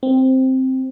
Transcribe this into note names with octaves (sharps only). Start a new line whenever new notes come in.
C4